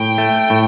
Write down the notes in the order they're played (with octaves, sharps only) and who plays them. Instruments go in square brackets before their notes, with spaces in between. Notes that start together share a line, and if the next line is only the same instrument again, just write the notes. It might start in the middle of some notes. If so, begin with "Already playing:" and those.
Already playing: [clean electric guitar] A2 [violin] G5
[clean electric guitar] A3
A2